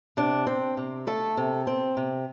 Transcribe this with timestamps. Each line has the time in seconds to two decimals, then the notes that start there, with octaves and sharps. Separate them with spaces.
0.17 C3 D4
0.47 C4
0.77 C3
1.07 A3 A4
1.37 C3
1.67 C4
1.97 C3